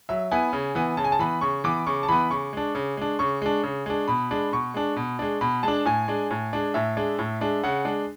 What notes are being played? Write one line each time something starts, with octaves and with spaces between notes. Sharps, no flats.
F#3 E5
B3 E4 G#5
C#3
E3 B3
C#3 A5
G#5
A5
E3 B3 B5
C#3 C#6
E3 B3 D6
C#3 C#6
A5
E3 B3 B5
C#3 C#6
G#3 D4
C#3
G#3 D4
C#3 C#6
G#3 D4
C#3
G#3 D4
B2 B5
G#3 D4
B2 C#6
G#3 D4
B2
G#3 D4
B2 B5
G#3 D4 A5
A2 G#5
G#3 D4
A2
G#3 D4
A2 E5
G#3 D4
A2
G#3 D4
C#3 F#5
G#3 D4